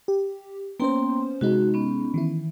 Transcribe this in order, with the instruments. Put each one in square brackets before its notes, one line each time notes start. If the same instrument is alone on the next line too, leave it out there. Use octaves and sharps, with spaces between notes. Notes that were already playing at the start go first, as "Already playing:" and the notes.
[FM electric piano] G4
[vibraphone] A#3 G5 C6 [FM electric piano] B3 C#4 C5
[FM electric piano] C3 G#3 D#4 [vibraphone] F#4
[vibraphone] B3 C#4
[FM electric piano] D#3 E3 E4